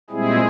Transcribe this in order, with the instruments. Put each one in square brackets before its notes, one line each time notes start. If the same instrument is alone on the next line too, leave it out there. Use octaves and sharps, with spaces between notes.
[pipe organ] A#2 G3 G#3 C4 E4 G#4